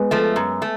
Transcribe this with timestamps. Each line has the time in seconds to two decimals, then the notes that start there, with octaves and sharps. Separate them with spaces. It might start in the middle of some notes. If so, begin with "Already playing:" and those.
Already playing: G#3 B3
0.11 F3 A3
0.36 F#2
0.62 A3